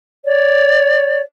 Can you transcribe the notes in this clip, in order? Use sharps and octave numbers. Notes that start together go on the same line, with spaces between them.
C#5 D5